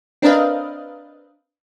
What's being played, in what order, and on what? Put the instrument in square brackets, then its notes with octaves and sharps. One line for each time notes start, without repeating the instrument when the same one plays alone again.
[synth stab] C4 D4 A#4 B4 D#5 F5